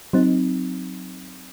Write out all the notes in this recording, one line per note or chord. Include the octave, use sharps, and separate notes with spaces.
F#3 C4 D#4